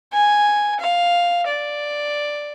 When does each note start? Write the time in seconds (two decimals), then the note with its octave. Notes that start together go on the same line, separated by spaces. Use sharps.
0.13 G#5
0.80 F5
1.47 D5